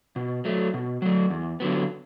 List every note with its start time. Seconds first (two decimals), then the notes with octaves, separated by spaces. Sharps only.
0.16 B2
0.45 F#3 A3
0.74 B2
1.02 F#3 A3
1.30 E2
1.60 D3 F#3 B3